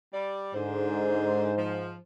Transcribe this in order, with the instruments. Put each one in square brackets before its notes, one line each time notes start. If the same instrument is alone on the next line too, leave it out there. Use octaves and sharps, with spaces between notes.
[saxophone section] G3 D5
[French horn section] G#2 [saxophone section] D3 C5
[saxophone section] F3